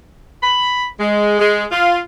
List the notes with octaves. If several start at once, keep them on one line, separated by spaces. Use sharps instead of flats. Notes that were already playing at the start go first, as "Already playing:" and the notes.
B5
G#3
G#3
F4